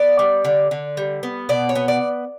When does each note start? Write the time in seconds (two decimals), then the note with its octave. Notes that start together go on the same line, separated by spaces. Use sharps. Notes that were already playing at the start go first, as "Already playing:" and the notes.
Already playing: B3 D5
0.19 G3
0.45 D3
0.71 D3
0.97 G3
1.23 B3
1.49 B2 D5
1.69 C#5
1.75 B3
1.88 D5